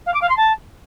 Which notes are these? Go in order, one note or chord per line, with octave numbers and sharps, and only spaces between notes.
F5
D6
F5
C6
A5